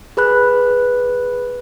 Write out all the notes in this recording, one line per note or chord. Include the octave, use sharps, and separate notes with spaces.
G#4 B4 B5 F#6